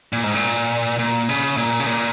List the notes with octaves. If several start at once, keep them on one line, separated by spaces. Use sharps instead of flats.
A#2
G#2
A#2
A#2
C#3
A#2
C#3
A#2